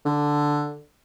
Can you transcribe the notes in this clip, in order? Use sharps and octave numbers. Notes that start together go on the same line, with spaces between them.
D3